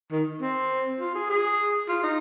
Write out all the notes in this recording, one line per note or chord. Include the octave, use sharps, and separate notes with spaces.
D#3
C4
F4
G#4
G#4
F4
D#4